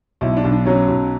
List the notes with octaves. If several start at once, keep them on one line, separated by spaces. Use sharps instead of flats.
B1 E4
D4
B1
D4
F#3 C#4
B1